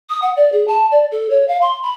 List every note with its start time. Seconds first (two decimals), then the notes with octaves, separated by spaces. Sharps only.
0.10 D#6
0.22 F#5
0.36 D5
0.53 G#4
0.68 A5
0.91 D5
1.12 A4
1.30 C#5
1.48 F5
1.61 C6
1.83 B5